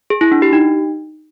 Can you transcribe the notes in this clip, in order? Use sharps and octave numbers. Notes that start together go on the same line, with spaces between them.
G#4
E4
D4
G4
D#4